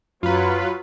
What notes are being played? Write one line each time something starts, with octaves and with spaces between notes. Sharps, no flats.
F#2 F#3 F4 B4